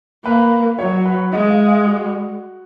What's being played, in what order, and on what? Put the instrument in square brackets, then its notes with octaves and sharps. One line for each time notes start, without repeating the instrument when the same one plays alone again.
[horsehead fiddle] A#3 [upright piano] B4
[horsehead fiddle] F#3 [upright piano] C#5
[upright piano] B4
[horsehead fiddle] G#3 [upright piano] D#5
[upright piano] F5
F5
F#4